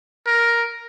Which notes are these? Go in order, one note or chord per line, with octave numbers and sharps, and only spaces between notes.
A#4